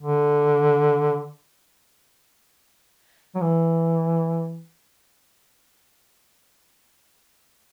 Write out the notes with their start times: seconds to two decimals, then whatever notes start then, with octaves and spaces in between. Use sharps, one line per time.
0.03 D3
3.35 F#3
3.41 E3